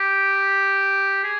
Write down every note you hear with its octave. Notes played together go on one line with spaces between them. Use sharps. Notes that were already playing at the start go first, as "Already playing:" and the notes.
Already playing: G4
G#4